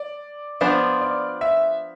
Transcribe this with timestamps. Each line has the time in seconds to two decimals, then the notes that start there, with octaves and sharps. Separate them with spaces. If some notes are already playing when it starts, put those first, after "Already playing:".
Already playing: D5
0.61 F3 B3 D4 F4
1.01 D5
1.41 E5